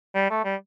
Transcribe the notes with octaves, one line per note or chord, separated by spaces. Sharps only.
G3
A3
G3